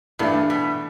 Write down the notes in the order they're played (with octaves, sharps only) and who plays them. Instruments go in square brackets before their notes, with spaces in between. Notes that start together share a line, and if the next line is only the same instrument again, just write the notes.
[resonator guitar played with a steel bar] G2 [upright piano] E3 A3 D4
[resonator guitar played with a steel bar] B2